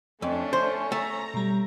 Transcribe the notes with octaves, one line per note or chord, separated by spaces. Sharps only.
F2 A3 C#4 D4
C5
A3 A#5
B2 G3